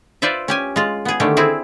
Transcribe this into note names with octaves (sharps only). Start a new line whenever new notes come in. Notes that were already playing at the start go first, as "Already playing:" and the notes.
F4 B4 C5 D5 E5
C#4 G4 G#5
G#3 F4
B3 G#4
D3 D#3 A3 C#4 G4
C4 E4 G#4